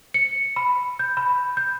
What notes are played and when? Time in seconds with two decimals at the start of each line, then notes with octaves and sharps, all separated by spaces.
0.14 C#7
0.56 B5
0.99 G6
1.17 B5
1.57 G6